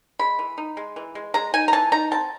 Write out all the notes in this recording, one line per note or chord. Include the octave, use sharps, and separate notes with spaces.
G#3 B5
E3
D#4
G#3
E3
G#3
G#3 A#5
D#4 G#5
A#5
E3 A5
D#4 A#5
C4 A5